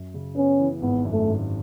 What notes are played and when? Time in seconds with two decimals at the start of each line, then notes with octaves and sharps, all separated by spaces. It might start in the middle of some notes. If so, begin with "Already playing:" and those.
Already playing: F#2
0.14 C#3
0.36 B3 C#4
0.60 E3
0.81 G#1 B3
1.05 F#2
1.12 A3
1.28 G#1